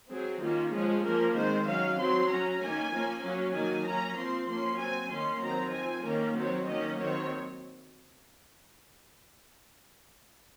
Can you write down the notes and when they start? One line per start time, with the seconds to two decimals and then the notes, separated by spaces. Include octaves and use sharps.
0.10 F#3 C4 G#4
0.42 D#3 A#3 C#4 F4
0.73 F3 G#3 C#4 G#4
1.04 F3 A#3 C#4 A#4
1.36 D#3 G#3 C4 C5
1.67 F#3 C#4 F5
1.98 F#3 C4 C6
2.29 F#3 C#4 A#5
2.61 D#3 A#3 C#4 G#5
2.92 F3 A#3 C#4
3.23 F#3 C#4
3.54 D#3 F#3 A#3 G#5
3.85 F#3 A#3 C#4 A#5
4.16 F3 C4 C6
4.48 F3 A#3 C#4 C6
4.79 F#3 C4 G#5
5.10 D#3 A#3 C#4 C6
5.41 D#3 F#3 C4 A#5
5.72 F3 C4 G#5
6.04 D#3 A#3 C#4 A#4
6.35 D#3 F#3 C4 C#5
6.67 D#3 F#3 A#3 C#4 D#5
6.98 D#3 F#3 C4 C#5